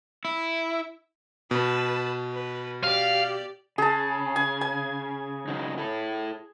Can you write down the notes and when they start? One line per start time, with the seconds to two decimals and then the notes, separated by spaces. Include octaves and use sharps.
0.25 E4
1.51 B2 B4 A5
2.33 B4
2.83 G4 D5 F5
3.78 C#3 G#4 A5
4.36 G#5
4.61 G#5
5.48 C#3 F#3 D#4
5.78 E4 A4